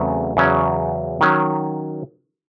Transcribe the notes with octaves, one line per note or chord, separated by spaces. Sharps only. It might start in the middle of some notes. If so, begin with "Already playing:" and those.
Already playing: E2 C#3 F#3 A3 C4
E2 C#3 F#3 C#4
D#3 F#3 C#4